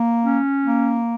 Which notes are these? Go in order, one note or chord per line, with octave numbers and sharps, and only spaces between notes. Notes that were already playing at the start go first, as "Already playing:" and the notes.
Already playing: A#3
C#4
A#3